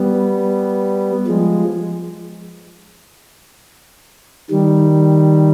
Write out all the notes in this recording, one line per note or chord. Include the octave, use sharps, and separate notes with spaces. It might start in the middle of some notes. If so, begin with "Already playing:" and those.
Already playing: G3 B3
F3 G#3
D#3 G3